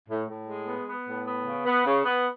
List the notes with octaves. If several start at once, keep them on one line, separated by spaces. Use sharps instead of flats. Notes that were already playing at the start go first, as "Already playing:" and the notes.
A2
A2
G#3
B3
B3
A2
B3
C#3
B3
C#3
B3